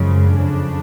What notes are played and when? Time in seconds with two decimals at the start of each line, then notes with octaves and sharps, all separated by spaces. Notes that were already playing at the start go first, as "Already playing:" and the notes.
Already playing: F#2 C#3 F3 G#3
0.33 F2 C#3 F3 D4